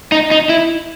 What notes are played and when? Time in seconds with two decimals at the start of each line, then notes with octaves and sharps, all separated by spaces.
0.12 D#4
0.31 D#4
0.49 E4